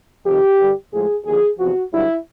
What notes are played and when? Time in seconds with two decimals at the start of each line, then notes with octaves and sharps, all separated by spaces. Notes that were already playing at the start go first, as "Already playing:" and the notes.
0.25 F2 C3 D#3 G4
0.58 G2 D3 G3
0.92 A2 F3 G#3 G#4
1.25 D#2 D3 F3 G#4
1.58 E2 C3 F3 F#4
1.92 G2 D3 F#3 E4